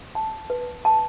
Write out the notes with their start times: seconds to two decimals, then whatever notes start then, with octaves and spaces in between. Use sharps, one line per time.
0.15 A5
0.50 B4
0.85 A5